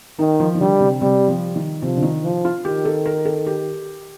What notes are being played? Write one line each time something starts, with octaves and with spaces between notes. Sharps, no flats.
D#3 D#4
F3
D#3
D3 G3
C3
C3 G3
F3
D#3
C3 F3
D3
D#3
F3
F4
D#3 G4
A4
A#4
A4
G4